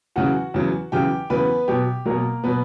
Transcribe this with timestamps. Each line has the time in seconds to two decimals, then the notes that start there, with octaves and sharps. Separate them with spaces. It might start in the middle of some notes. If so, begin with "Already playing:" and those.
0.16 E2 C#3 F#3 F#4 F#5
0.54 E2 C#3 F#3
0.92 E2 C#3 F#3 G4 G5
1.30 E2 C#3 F#3 B3 B4
1.68 B2 F#3 G4
2.06 B2 F#3 A#3 A#4
2.44 B2 F#3 B3 B4